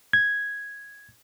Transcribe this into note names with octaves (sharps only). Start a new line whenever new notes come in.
G#6